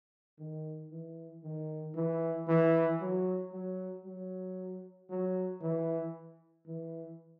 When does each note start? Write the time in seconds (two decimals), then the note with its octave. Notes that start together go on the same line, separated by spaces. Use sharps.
0.39 D#3
0.91 E3
1.44 D#3
1.95 E3
2.48 E3
3.01 F#3
3.52 F#3
4.05 F#3
5.10 F#3
5.61 E3
6.66 E3